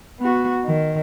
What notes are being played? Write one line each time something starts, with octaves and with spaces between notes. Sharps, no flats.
B3 F#4
D#3